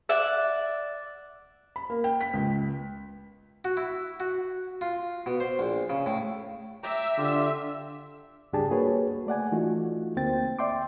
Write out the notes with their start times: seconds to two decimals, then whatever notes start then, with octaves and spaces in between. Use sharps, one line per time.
0.09 D5 E5 F#5
1.76 B5
1.90 A#3
2.04 G5
2.21 B6
2.34 C#2
3.65 F#4
3.77 E4
4.20 F#4
4.81 F4
5.26 B2
5.40 C5
5.59 A#1
5.90 C#3
6.06 A2
6.83 E5 G5 A#5 D6
7.18 D3 F4 G4
8.53 C#2 G2 D4 G4 G#4 A5
8.71 A#3 F#4 G#4 B4 C#5
9.27 A3 D5 F#5 G#5
9.52 E3 A3 D#4 F4 F#4
10.16 D2 A#3 C4 G5 A6
10.59 D5 E5 G5 C6 D6